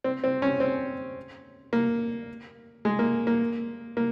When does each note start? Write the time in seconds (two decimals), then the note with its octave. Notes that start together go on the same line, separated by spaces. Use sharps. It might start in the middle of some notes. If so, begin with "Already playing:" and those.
0.04 C4
0.24 C4
0.42 C#4
0.60 C4
1.73 A#3
2.85 G#3
2.99 A#3
3.27 A#3
3.97 A#3